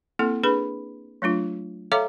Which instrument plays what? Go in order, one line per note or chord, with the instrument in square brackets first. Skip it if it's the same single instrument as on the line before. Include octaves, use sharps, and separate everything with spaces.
[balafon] A#3 C4 E4 A4
D4 G#4 B4 B5
F#3 A3 D4 F4
A4 C#5 E5 F5 A#5 D6